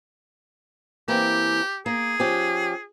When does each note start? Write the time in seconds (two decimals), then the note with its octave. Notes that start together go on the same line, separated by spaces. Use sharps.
1.08 E3 A#3 C4 G4
1.86 A#3 G#4
2.19 F3 C#4 G4